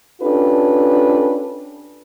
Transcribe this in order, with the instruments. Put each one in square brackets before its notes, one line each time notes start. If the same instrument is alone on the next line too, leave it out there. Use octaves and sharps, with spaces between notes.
[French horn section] C#4 D4 F4 G4 A4 B4